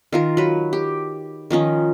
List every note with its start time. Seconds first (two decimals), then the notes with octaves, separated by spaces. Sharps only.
0.12 D#3 F4 A#4
0.37 F#3 B4
0.73 G4
1.50 D#3 F3 C#4 D#4